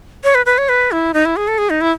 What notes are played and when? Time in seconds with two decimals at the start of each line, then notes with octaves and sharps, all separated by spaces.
0.24 C#5
0.35 B4
0.46 B4
0.58 C#5
0.69 B4
0.92 E4
1.14 D#4
1.25 E4
1.36 G#4
1.48 A4
1.58 G#4
1.70 D#4
1.81 E4